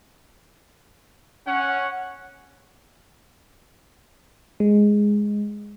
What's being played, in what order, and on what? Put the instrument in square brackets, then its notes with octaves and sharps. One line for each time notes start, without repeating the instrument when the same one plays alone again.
[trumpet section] C#4 F#5
[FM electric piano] G#3